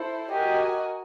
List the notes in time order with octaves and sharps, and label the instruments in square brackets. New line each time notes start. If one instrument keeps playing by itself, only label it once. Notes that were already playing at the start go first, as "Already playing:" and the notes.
Already playing: [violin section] E4 A4 C5
[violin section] F#4 A#4 D#5 G#5 [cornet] G4